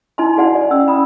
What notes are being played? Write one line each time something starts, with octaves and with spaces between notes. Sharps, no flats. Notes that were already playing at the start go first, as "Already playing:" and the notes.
D#4 E4 G#5 A5 C6
F#4 G#4 D5 F#5 G#5 A5
D5
C#4 E6
B5 D#6